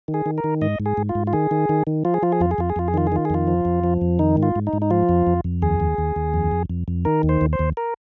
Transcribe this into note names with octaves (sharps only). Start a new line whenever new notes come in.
D#3
G#4
D#3
A#4
D#3
G#2 D#5
G#2
G#4
G#2
F4
G#2
F4
D#3 G#4
D#3
D#3
D#3
F3 F4
G#4
F3 F4
G#4
F2 F4
G#4
F2 F4
G#4
F2 F4
G#4
D#3 F4
G#4
D#3 F4
G#4
F2 F4
F3
F2
F3
F2
D#3 D#4
G#2
F4
G#2
D#4
G#2
D#4
F3 F4
F2
F2
F2
D#2 G#4
D#2
D#2
D#2
F2
F2
F2
F2
D#3 A#4
D#2
C5
D#2
C5
D#2
A#4